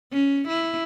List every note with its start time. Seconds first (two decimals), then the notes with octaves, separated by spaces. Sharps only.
0.13 C#4
0.49 E4